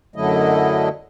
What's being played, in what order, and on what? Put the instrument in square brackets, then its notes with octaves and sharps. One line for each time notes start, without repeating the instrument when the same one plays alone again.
[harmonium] F#2 D3 F#3 A3 E4 D#5